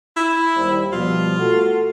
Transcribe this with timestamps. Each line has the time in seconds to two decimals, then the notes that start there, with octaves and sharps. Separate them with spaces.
0.17 E4
0.57 D#2 G3 C5
0.93 B2 F3 G3 F4
1.39 A3 F#4 A4